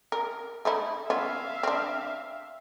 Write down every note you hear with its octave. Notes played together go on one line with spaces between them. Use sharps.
A#4
A3 D#4 E4
B3 C#4 F4 E5 F5
C4 D4